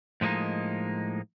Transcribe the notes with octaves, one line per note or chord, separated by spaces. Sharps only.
A2 F3 G#3 A#3 D#4